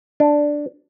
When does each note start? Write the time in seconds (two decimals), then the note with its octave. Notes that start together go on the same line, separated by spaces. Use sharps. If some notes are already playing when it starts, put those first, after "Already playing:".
0.20 D4